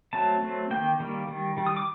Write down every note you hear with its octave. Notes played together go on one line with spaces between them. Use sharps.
F#3 A3 C4 A5
F#3 A3 C4
D#3 G3 A#3 G5
D#3 G3 A#3
D#3 G3
D#3 G3
D#6
D6